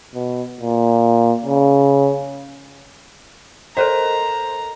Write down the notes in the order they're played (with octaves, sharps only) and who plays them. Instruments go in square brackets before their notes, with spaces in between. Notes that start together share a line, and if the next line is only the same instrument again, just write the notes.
[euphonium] B2
A#2
C#3
[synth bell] A4 A#4 D#5 [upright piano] C5 [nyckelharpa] A#5